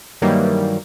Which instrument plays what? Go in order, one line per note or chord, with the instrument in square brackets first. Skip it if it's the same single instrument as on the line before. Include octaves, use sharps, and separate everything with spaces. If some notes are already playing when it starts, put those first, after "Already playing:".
[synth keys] G2 D#3 E3 F#3 G3 A#3